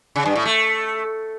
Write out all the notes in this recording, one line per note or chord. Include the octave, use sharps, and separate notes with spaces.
C#3
G2
A2
A3